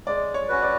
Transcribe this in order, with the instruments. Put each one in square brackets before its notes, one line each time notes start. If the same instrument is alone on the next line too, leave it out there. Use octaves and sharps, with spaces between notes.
[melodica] G#3 [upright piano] D5
[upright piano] C#5
[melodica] C#4 F#4 B4
[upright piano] D5